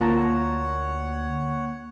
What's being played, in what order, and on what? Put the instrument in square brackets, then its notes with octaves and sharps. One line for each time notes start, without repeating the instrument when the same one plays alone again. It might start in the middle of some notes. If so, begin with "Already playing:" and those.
[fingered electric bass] D2 [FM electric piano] A#3 [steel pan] F4 A5 A#5 [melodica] C#5 F#5